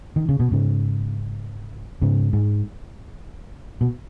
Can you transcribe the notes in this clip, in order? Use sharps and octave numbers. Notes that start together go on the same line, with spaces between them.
D#3
C#3
B2
G#2 C#3
G#2 C#3
G#2
B2